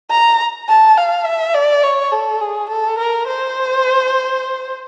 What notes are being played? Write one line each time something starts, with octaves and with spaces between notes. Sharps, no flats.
A#5
A5
F5
E5
D5
C#5
A4
G#4
A4
A#4
C5